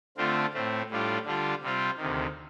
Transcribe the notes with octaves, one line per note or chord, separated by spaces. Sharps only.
D3 A3 C4 F4
A2 A3 C4
A2 G3 D4 F4
D3 G3 D4 F4
C3 G3 C4 F4
D2 C3 D#3